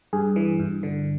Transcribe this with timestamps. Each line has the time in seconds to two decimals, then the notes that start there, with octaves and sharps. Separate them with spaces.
0.13 G2 G#4
0.36 E3
0.59 G2
0.83 D3